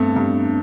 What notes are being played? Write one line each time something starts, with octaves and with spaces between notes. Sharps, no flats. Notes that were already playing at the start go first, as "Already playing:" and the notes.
Already playing: G2 A3 B3 C4
G2 D4